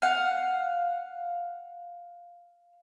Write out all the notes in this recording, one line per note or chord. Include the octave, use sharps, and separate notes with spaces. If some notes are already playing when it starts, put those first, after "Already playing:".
F5 F#5